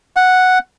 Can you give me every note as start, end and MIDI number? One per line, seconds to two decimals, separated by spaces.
0.16 0.59 78